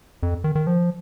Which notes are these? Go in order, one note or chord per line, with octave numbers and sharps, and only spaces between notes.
F2
D#3
D#3
F3